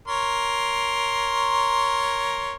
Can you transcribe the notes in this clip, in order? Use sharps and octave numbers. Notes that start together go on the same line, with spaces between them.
A#4 C#5 C6